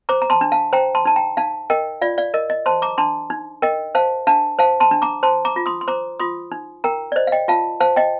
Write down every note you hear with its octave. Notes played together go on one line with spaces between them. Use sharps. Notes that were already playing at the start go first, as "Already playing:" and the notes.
C5 A#5 D6
A#5
A5 C6
D4
F5 A5
C5 G5 A#5
A5 C6
D#4 A5
G5 A#5
D#4 F5 A5
A#4 D#5 G5
F4 D5 F5
D5 F5
A#4 D#5
D#5
C5 A5 C6
A#5 D6
D4 A5 C6
D#4
A#4 D#5 G5
C5 F5 A5
D4 F5 A5
C5 F5 A5
A5 C6
D4
A#5 D6
C5 A5 C6
A#5 D6
F4
C6 D#6
C6
C5 A#5 D6
F4 C6 D#6
D#4
A#4 G5 A#5
D5
C5 D#5
F5
D#5 G5
F4 F5 A5
C5 F5 A5
D#5 G5